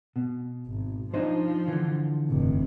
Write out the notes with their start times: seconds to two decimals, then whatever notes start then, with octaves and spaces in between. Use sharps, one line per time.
0.16 B2
0.67 G#1
1.14 F3 D4 D#4 C5
1.68 D3 E3
2.28 F1 C3